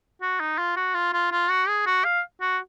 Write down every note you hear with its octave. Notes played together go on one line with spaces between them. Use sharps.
F#4
D#4
F4
F#4
F4
F4
F4
F#4
G#4
F#4
F5
F#4